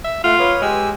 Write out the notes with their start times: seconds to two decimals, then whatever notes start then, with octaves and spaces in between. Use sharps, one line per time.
0.04 E5
0.24 A3 F4 F#5 F6
0.39 B4 C#5 D#6
0.62 G#3 G4 G#5 E6